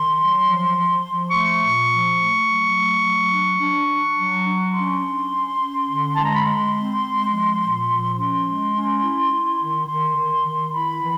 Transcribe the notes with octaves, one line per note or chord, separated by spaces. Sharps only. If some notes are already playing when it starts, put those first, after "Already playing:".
Already playing: D#3 C6
F#3
F3
F3
F3
A3 C#6
A#2
F3
A3
F#3
A3
F#3
D4
D4
D4
F#3
D4
C#4 C6
C#4
C#4
C#4
D3
G#3 A5
A#5
B5
G#3 C6
C4
G#3
F3
A#2
F3
C#4 C6
G#3
C#4
E4
E4
D#3
D#3 C6
D#3
D#3
E4 B5
E3